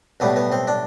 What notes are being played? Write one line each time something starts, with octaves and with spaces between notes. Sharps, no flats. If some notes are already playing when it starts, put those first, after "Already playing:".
B1 A2 G3 B3
B3
C4
D4